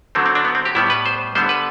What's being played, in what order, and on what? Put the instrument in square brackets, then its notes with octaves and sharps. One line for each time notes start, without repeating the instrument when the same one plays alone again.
[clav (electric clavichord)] D3 F#3 A3 C4
C4
D4
B3
C4
G4
A2 G3 B3 E4
B4
C5
D3 G3 B3 C5
B4